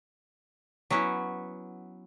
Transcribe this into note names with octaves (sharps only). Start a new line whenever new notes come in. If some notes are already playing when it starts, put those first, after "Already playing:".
F#3 B3 C#4 E4